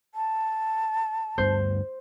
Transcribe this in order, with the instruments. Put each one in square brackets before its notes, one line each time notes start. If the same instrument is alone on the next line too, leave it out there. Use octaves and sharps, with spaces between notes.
[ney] A5
[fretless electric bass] D2 G2 B3 [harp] C5